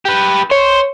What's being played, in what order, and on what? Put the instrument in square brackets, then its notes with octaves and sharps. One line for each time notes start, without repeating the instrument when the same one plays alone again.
[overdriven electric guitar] G4 B4
[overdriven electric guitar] C5 [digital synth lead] C#5